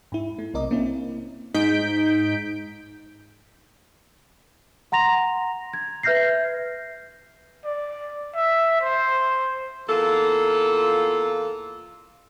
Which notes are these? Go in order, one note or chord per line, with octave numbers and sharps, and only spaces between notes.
G#2 E4
A3
B1 C3 A#4 D#5 D6
A#3 C4 C#4 E4
G#2 D#4 G6 B6 D7
F#5 A#5 C6 A#6 F7
G#6
B4 E5 F6 G6 A#6 C7
D5
E5
C5
E2 A#3 F4 A4